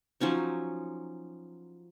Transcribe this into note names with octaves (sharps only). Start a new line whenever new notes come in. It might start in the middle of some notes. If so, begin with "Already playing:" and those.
F3 F#3 C#4 D#4